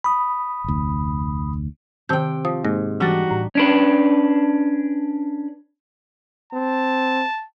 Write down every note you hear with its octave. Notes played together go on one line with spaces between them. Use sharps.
B5 D#6
F1 D2
C3 D#3 G5 A5 G6
F3 D#6
G#2 A#3
E3 G3 D4 D#4 F#4 A6
A2
C#4 D4 B4
C4 A5